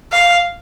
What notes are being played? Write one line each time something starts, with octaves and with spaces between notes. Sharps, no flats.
F5